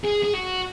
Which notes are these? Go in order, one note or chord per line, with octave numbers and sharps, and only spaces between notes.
G#4
G#4
F#4